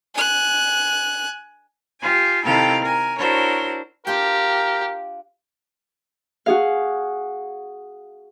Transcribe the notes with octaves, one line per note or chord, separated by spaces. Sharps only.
G#5 F#6
F4 G4 G#5
C3 D#3 E4 A4 F5 G5
A#4 G#5
D4 E4 F#4 A#4 C5 C#5
D4 F4 G4 A#4 G5
F#4 G#4 F5